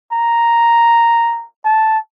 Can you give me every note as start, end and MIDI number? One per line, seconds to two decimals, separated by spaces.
0.12 1.45 82
1.65 1.98 81